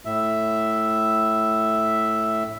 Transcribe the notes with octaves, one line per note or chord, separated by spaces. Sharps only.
A2 E5